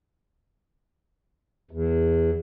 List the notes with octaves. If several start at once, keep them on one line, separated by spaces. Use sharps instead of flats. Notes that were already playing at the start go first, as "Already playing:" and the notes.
E2